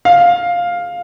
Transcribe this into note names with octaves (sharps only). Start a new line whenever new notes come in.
F5